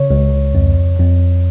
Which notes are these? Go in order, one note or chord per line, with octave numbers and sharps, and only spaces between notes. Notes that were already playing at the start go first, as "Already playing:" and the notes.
Already playing: C#3 C#5
C#2
F2
F2